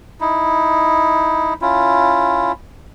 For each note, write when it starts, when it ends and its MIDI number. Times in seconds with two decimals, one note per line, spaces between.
0.21 1.54 63
0.21 1.54 64
1.62 2.52 61
1.62 2.52 64
1.62 2.52 65